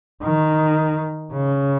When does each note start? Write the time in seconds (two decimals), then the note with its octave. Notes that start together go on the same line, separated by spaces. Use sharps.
0.23 D#3
1.33 C#3